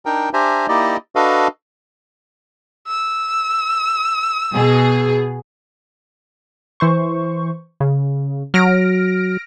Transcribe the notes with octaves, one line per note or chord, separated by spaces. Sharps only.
D4 D#4 A#4 G5
D4 G4 C5 E5 G#5 A#5
A#3 D#4 E4 G4 D5 D#5
D4 F#4 A4 B4 D#5 F5
E6
B2 G#4
E3 C5 C#6
C#3
F#3 F6 A#6 D7